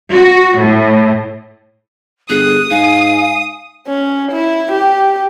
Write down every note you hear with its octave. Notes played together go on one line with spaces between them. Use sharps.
F#4
A2
G1 G#4 D#6 F#6
G#2 F5 G#5
C#4
E4
G4